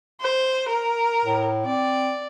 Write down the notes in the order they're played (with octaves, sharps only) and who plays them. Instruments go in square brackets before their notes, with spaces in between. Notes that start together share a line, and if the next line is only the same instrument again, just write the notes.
[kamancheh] C5
A#4
[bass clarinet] A2
[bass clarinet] C4 [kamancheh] D5